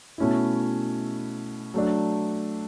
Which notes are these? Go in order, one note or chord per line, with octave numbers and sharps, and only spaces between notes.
B2 A3 C#4 E4
F#3 A3 D4